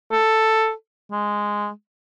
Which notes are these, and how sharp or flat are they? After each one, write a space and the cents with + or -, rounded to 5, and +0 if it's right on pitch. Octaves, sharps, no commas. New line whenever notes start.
A4 +5
G#3 -5